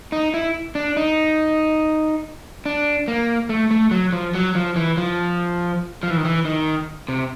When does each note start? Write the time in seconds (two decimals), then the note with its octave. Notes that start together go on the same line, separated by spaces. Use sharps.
0.12 D#4
0.34 E4
0.75 D4
0.97 D#4
2.66 D4
3.08 A#3
3.49 A3
3.71 A3
3.91 F#3
4.13 F3
4.35 F#3
4.55 F3
4.76 E3
4.97 F3
6.03 F3
6.10 E3
6.17 D#3
6.25 E3
6.45 D#3
7.08 C3